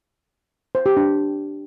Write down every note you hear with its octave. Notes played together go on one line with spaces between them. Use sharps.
C5
G4
D4